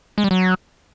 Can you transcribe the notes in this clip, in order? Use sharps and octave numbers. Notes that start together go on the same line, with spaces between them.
G#3
G3
F#3